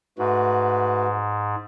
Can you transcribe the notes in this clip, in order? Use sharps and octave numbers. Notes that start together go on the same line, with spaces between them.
G#2 A3 F#4 B4